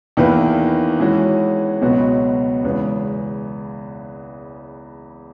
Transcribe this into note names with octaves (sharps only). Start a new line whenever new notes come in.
E2 D#3 A#3 E4 B4
E3 G#3 C#4 F#4
C#2 B2 F#3 B3 F#4
E2 C#3 G#3 B3